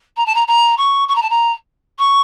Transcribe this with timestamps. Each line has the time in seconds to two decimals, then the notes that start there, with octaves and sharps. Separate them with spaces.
0.17 A#5
0.26 A5
0.35 A#5
0.47 A#5
0.77 C#6
1.08 C#6
1.15 A#5
1.22 A5
1.30 A#5
1.98 C#6